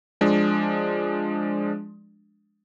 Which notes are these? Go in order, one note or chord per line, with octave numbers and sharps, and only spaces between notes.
F3 G#3 D4